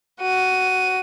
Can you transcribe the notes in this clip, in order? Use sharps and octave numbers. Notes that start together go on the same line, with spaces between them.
F#4 D#7